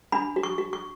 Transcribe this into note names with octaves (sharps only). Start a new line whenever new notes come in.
D4 B5
F#4
C#6
F#4
C#6